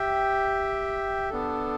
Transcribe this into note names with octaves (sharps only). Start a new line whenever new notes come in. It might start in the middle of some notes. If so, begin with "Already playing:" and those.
Already playing: G4 E5 G5
B3 D4 A4